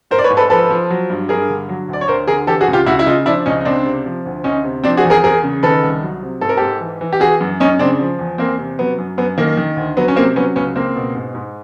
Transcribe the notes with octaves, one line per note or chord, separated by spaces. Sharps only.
G#2 A#4 C5
D5
B4 C#5
G#2
A4 B4
F3 A4 B4
F3
F#3
G2
G2 G#4 A#4
D3
F#3
D2 D5
C#5
D2 A#4 C5
D3 G#4 A#4
E3 G4 A4
F#4 G#4
C#2
F4 G4
C#2 E4 F#4
E4
C#3 D#4 F4
F3 D4 E4
C#2 C#4 D#4
D#4
C#2 C4 D4
C3
F3
D2
D2 C#4 D#4
C3
F3 C4 D4
F#4 G#4
E2
G#4 A#4
E2 G#4 A#4
C#3
D#3 A4 B4
C2
F#3
C3
G#2 A4
A#4
G#2 G4 A4
E3
E3
G4
E3 F#4 G#4
F#2
F#2 C#4 D#4
C#3 C4 D4
F3
E2
E2 A#3 C4
C3
F#3 B3
F#2
F#2 B3
D#3 A#3
D#3
D2
F#3 B3
C#4
C3 A#3 C4
F#3 B3 C#4
C#2 B3 C#4
C#2 A#3 C4
B2
G#2
G#2